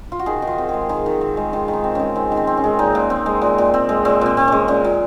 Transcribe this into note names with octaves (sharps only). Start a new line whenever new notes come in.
F4
F#4
D#3 G#4
D#3
F4
C4
G#3 G#4
D#3 G#4
D#3
C4
G#3
D#3 F4
D#3
D#4
C4
G#3 C#4
D#3 C4
D#3
C4
C4
C#4
G#3
A#2 D#4
A#2
C4
G#3
A#2
A#2
C4
G#3
A#2 C4
A#2 C4
C4
G#3 C#4
A#2 C#4
A#2